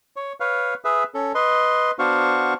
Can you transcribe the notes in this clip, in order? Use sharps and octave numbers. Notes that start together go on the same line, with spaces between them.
C#5
B4 C#5 F5
G#4 B4 E5
C#4 A4
B4 D#5 C6
B3 D4 F#4 C5 F5 C#6